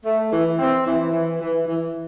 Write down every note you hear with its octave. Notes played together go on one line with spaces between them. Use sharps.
A3
E3
C4
E3
E3
E3
E3